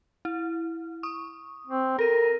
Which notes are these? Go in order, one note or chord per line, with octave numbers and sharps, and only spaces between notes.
E4
C#6 D#6
C4
A4 A#4 D#7